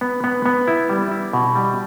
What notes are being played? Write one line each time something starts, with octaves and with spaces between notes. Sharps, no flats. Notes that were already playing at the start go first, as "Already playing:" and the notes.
B3
B3
B3
E4
G3
E4
B2
G3